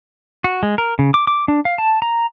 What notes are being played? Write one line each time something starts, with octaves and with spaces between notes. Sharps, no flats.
F#4
G#3
A#4
C#3
D6
D6
D4
F5
A5
A#5